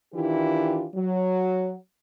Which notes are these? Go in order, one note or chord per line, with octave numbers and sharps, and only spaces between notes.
D#3 E3 D4 E4 F4 G4
F#3